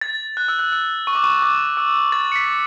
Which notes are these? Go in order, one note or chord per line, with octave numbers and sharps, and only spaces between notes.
A6
F#6
E6
F#6
E6
C#6
D6
C#6
D6
E6
A6
C#7
B6